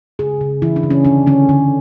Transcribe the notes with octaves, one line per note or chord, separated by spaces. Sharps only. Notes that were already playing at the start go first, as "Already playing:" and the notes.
C#3 G#4
C#3
E3 E4
D4
C#3
C#4
D3 D4
D3 C#4
D3